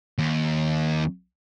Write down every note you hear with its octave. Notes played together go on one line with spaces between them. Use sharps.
D#2